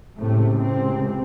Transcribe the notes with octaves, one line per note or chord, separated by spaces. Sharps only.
C#2 A2 C3 A3
C3 C4